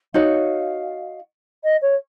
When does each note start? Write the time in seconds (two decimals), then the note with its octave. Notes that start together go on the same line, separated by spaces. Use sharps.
0.14 D#4 F#4 C#5 F5
1.63 D#5
1.81 C#5